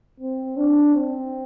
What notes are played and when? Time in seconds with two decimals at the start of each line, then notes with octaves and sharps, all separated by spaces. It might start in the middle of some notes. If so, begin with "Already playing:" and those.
0.20 C4
0.57 D4
0.95 C4